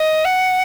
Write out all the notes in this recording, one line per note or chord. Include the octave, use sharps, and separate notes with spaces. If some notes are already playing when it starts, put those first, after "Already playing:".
Already playing: D#5
F#5